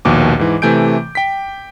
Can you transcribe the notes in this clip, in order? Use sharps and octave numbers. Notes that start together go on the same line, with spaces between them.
A#1 D#2 B2 D6
G#2 E3
C3 E3 A3 G#5 G6 D7
G5 B6